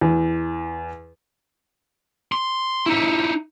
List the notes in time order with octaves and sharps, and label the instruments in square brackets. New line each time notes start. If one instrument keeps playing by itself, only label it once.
[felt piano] E2
[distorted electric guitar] C6
D#4 E4